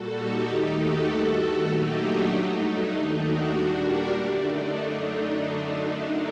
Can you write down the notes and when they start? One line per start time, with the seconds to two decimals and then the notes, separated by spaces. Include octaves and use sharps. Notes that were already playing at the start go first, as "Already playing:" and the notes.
Already playing: A#2 G3 F#4 A4
0.15 D#4 G4
0.45 D#2 D#3 A3 D#4 G4
0.76 F#4 A4
1.07 G2 D#3 A3
1.37 F#4 A4
1.67 A#2 F#3 A3 D#4 G4
1.98 D4 F#4
2.28 G2 F#3 A3 D#4
2.59 D4
2.89 D#2 D#3 A3 D#4
3.20 D4 F#4
3.50 A#2 G3
3.80 G4 A#4
4.11 F#2 D3 A3 D4
4.41 D#4